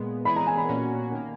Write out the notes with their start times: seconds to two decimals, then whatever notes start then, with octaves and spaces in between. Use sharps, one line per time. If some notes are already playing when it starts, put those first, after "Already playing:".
Already playing: A#2 G#3 B3
0.25 E3 G#3 B3 E4 G#4 B5
0.36 A#5
0.47 G#5
0.57 B5
0.69 A#2 A#3 C#4 F#4
1.12 D#3 A#3